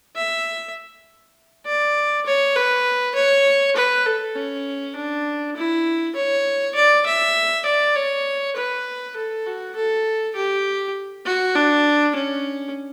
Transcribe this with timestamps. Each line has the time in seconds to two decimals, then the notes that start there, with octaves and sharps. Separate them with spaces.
0.17 E5
1.66 D5
2.26 C#5
2.57 B4
3.16 C#5
3.76 B4
4.06 A4
4.36 C#4
4.96 D4
5.56 E4
6.16 C#5
6.76 D5
7.06 E5
7.66 D5
7.96 C#5
8.57 B4
9.17 A4
9.47 F#4
9.76 A4
10.36 G4
11.26 F#4
11.56 D4
12.16 C#4